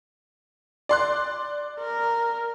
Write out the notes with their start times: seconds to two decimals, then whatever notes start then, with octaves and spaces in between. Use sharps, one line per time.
0.89 D5 C6 F#6
1.80 A#4